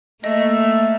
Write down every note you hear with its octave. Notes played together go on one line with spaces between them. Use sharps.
A3 A#3 D#5